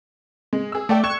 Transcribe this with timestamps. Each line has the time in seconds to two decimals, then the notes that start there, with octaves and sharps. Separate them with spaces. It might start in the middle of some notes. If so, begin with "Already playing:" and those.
0.53 G#3
0.72 G#4 E6
0.89 A3 A4 D5 G5
1.04 C#6 F#6 G#6 E7